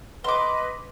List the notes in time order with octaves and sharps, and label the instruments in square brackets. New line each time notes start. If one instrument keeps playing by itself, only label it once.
[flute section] B4 D#5 [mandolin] C6 D6